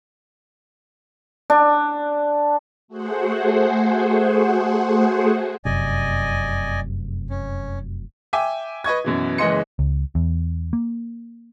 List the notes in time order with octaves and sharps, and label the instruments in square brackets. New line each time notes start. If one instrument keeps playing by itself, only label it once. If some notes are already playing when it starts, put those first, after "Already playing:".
[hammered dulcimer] D4
[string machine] A3 F#4 G#4 C5 F#5
[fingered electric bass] F1 F#2 C3 [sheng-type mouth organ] D5 D#5 G#5
[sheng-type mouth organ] C#4
[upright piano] E5 G5 G#5 D6
B4 D#5 C#6 G#6
F#2 B2 E3
F#1 E3 G#3 D#5 C6 C#7
[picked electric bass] C#2
E2
A#3